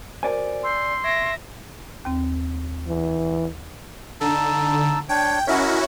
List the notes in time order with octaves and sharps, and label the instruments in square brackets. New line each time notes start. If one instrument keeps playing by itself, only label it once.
[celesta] F#4 A#4 C5 [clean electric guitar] D5 G#5
[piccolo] C6 [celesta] C#6 E6 G6
[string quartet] E5 A#6 [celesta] C#6 G#6 D7
[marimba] D#2 C4
[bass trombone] E3
[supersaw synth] D3 [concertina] D#4 A5 E6
[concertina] D4 C#5 [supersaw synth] G5
[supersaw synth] C#4 E4 F#4 [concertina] A#4 D#5 E5